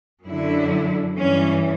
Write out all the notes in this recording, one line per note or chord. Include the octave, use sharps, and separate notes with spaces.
F#2 D3 F#3 E4
G2 E3 C#4